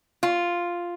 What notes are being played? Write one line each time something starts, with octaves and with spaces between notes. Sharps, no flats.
F4